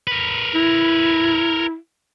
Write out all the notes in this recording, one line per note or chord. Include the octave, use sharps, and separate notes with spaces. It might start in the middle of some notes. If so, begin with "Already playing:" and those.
A#4 B4
E4